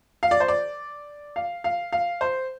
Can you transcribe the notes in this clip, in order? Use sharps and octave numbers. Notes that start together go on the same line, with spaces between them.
F5
D5
C5
D5
F5
F5
F5
C5